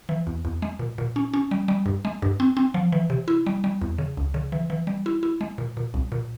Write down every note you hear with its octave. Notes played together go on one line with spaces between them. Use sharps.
E3
E2
E2
G#3
A#2
A#2
C#4
C#4
G3
G3
G2
G#3
G2
C4
C4
F3
E3
C3
E4
G3
G3
E2
C#3
C#2
C#3
E3
E3
G3
E4
E4
G#3
A#2
A#2
C2
A#2